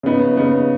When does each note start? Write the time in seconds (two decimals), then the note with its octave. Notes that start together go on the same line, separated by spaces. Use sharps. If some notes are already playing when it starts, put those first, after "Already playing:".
0.03 C#3 B3 D#4
0.36 C#3 B3 D#4